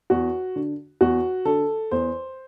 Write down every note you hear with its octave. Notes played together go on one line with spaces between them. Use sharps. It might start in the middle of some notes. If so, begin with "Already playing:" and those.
E2 F#4
D3
E2 F#4
D3 A4
E2 C5